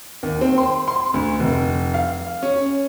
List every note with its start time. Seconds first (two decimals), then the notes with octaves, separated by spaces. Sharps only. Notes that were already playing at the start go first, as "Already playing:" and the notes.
0.23 D#2
0.41 C4
0.58 C6
0.88 C6
1.14 D2
1.40 F1
1.94 F5
2.43 C#4